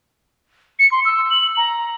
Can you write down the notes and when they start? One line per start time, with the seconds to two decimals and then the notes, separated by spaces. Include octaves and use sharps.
0.79 C#7
0.91 C6
1.05 E6
1.30 F#7
1.57 A#5